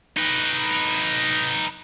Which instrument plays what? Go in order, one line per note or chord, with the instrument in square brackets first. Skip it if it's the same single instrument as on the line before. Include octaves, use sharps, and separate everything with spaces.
[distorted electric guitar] D#4 B4